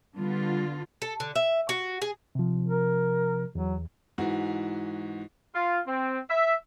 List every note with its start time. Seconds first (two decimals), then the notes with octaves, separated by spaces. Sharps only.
0.16 D3 G3 B3 F4
1.02 A4
1.20 D3
1.36 E5
1.69 F#4
2.02 G#4
2.35 C3 F3
2.67 A#4
3.55 E2 F#3
4.18 G#2 E3 F#4
5.55 F4
5.87 C4
6.30 E5